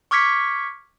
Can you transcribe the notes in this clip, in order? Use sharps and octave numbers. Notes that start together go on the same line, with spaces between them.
C#6 D6 F6 G#6 B6 C#7